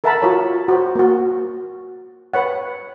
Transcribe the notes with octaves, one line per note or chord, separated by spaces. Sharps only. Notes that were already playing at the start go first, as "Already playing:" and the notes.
A4 A#4 E5 F#5 A5 B5
F4 F#4 A#4 C#5
F#4 C5
A#3 F#4
B4 C#5 F#5